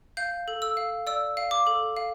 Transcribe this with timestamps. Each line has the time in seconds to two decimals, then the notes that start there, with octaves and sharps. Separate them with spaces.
0.17 F5 G6
0.48 A4
0.62 E6
0.77 F5
1.07 D5 E6
1.37 F5
1.51 D6
1.67 A4
1.97 F5